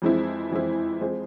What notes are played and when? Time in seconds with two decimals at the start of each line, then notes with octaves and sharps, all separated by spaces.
0.02 F2 E3 G#3 C4 E4
0.51 F2 E3 G#3 C4 E4
1.01 F3 G#3 C4